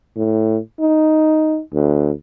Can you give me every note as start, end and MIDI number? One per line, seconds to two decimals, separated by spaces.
0.17 0.58 45
0.80 1.60 63
1.74 2.11 38